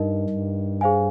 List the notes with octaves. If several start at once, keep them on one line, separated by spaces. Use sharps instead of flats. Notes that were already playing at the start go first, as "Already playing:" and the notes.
Already playing: G2 D#4 A#4 D#5
G2
G#4 C5 F5 G#5